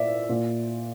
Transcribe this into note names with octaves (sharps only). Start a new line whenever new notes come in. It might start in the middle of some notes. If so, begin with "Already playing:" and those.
Already playing: A#2 D5 E5
A#2